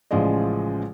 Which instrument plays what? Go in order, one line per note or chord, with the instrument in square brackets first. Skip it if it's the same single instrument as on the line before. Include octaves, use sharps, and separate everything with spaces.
[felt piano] A1 C#3 F3 G#3 D5 D#5